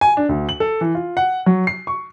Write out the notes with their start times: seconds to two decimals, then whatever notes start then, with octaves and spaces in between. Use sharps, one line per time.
0.01 G#5
0.17 D4
0.29 D2
0.49 F#7
0.60 A4
0.81 E3
0.95 F4
1.17 F#5
1.46 F#3
1.67 C7
1.87 C#6